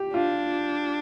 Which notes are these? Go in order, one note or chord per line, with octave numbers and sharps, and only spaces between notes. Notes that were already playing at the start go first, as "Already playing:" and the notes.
Already playing: G4
D4 F4